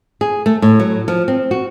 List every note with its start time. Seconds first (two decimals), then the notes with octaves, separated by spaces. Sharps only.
0.21 G#4
0.46 A3
0.62 A2
0.80 F#3
1.08 F3
1.28 C4
1.51 F#4